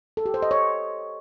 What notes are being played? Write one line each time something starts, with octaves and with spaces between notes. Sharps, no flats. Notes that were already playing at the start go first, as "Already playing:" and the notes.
A4
G4
C5
D#5
C#5